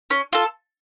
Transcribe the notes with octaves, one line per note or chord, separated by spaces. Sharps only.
C#4
F4 A4